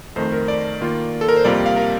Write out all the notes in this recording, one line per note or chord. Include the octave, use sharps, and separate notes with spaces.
F2 D#3 A3 D#4 C5
A#4
D5
D#3 A#3 F4
A4
A#4
C5
F2 C3 G3 A#3 F4 D5
F5
A#4